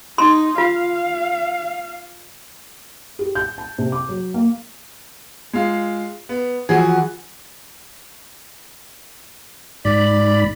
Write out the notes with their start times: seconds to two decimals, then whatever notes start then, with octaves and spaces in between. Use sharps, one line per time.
0.18 D#4 C6
0.58 F4 F5
3.19 G4
3.35 G6
3.58 A5
3.78 C3
3.92 D6
4.09 F#3
4.34 A#3
5.53 G#3 F4
6.29 B3
6.69 E3 F3 F#4 G#4
9.85 G#2 D5 B5